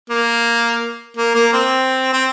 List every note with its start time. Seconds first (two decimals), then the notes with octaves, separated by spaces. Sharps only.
0.10 A#3
1.17 A#3
1.35 A#3
1.53 C4
2.13 C4